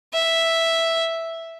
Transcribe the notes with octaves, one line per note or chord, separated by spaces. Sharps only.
E5